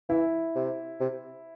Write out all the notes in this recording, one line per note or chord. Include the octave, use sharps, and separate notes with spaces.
E3 E4
C3
C3